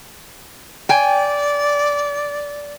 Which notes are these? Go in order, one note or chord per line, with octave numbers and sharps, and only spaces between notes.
D5 G5 G#5